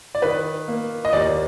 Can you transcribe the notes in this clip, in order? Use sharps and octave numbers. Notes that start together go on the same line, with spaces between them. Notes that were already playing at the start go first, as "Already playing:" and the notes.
D5
D#3 B4
A#3
D#5
D#2 D5